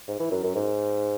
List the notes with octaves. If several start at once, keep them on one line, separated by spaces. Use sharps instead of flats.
G#2
E3
F#2
F#2
G#2